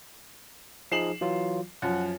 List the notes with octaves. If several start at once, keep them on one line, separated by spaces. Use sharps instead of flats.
F3 D#4 G#4 C7 E7 F#7
E3 F#3 F4
F#2 F3 F#5